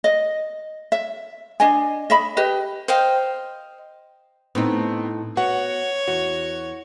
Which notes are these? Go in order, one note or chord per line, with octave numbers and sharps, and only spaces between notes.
D#5
E5
D4 D#5 G#5
D#5 E5 B5
G4 B4 D#5
C5 D#5 F5 G5
A2 B3 C4 D#4
B3 F#4 C#5 F#5
E2 F#4